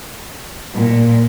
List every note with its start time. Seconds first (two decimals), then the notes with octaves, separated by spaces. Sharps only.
0.75 A#2